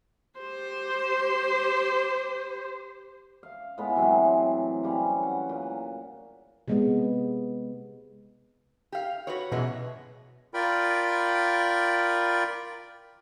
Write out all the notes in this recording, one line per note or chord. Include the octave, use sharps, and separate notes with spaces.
G4 C5
F5
A2 G#3 B3 B5
C3 E3 F#3 C4
C#3 G3 C#4
F#5
A#2
C3 G#3 B3
G4 F5
F#4 B4 C#5
F#2 B2 E3 G#3
F4 A#4 D5 G5 B5